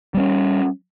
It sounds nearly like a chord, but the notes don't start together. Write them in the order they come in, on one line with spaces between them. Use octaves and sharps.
G3 B3 C#4